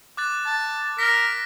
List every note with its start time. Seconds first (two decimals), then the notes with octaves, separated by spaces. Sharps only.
0.17 D6 F#6 A6
0.46 A5
0.99 A#4 F6 A#6 B6